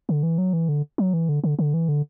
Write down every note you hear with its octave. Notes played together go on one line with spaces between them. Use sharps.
D3
E3
F#3
E3
D3
F#3
E3
D3
D3
D3
E3
D3